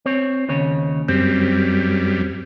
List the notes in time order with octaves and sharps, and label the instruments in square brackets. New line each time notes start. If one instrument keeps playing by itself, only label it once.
[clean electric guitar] C4 C#5
D#2 C#3 C#5
[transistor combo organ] F#2 G3 [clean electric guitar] C4